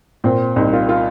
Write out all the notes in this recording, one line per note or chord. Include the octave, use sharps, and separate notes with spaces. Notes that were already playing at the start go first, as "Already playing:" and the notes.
A#2 C4
C2 D#4
F4
F4